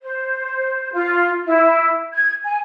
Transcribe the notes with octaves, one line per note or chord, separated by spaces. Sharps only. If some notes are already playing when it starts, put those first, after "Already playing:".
C5
F4
E4
G#6
G#5